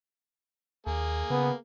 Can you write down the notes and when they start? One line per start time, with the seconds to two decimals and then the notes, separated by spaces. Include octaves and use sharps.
0.87 D#2 A#3 G#4
1.30 C#3 B3